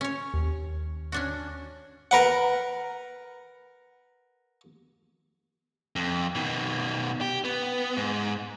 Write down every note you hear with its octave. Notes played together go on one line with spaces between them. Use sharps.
C#4 C#5
D#2
C#4 D4 F#4
A#4 B4 F#5
F2
B2 D#3
G4
B3
G#2